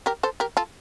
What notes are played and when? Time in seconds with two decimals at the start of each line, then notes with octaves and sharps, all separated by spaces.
0.06 G4 A#4
0.23 A4 C5
0.40 G4 A#4
0.57 F4 A4